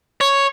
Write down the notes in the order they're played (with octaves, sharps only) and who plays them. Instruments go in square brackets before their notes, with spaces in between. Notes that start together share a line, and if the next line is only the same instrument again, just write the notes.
[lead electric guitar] C#5